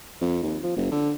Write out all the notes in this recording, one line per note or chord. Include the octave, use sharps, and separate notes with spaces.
F2
D#2
F3
F#1
D3